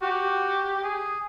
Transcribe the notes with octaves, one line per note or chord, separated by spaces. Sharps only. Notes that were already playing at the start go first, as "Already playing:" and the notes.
F#4 G4
G#4